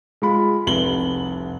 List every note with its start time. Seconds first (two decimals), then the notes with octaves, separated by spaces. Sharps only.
0.22 G#3 F4 B5
0.67 F1 C2 F#7 G7